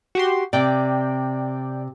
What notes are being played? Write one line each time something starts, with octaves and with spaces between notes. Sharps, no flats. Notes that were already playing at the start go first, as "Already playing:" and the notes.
F#4 G4 C6
C3 D5 G5